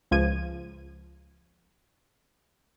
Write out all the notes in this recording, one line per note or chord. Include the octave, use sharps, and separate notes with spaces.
C#2 F3 G#6 D#7